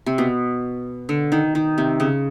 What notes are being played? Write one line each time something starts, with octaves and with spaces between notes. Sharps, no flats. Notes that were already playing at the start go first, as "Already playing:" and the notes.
C3
B2
D3
D#3
D#3
C3
C#3